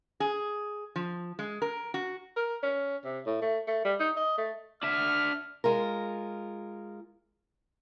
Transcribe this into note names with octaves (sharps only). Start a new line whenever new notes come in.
G#4
F3
G#3
A#4
F#4
A#4
C#4
C3
A2
A3
A3
G3
D#4
D#5
A3
D4 E5 F6
G#3 F4 A#4